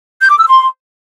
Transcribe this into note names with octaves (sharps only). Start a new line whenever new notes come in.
G6
D6
E6
C6